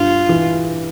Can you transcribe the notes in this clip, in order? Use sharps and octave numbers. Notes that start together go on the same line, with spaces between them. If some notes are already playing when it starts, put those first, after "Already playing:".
Already playing: G2 F4
E3